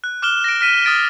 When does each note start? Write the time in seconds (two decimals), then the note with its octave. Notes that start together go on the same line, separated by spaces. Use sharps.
0.04 F#6
0.22 D6 F6 F#6 E7 G7
0.44 A#6 D7
0.61 F6 B6 D#7 E7
0.85 D#6 F6 A6 D7